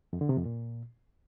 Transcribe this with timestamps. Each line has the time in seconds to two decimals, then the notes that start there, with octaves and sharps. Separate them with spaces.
0.13 F2
0.21 D3
0.29 C3
0.37 F2
0.45 A#2